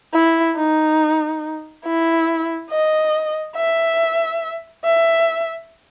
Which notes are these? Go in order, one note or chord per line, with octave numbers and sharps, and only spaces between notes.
E4
D#4
E4
D#5
E5
E5